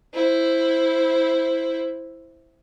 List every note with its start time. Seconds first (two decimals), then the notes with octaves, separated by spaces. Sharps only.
0.14 E4 C5